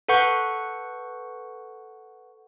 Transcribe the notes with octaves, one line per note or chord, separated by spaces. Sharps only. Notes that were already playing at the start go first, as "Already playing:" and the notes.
A4 B4 F#5 C#6 G6